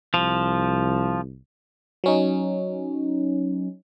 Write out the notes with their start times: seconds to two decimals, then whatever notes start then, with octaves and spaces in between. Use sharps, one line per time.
0.14 C2 F3
2.04 F#3 C#4 D#4